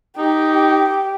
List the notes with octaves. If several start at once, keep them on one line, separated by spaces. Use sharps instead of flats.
D#4 G4